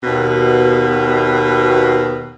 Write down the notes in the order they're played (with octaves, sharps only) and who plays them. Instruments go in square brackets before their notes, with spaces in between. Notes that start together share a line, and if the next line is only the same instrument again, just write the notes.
[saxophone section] D#2 B2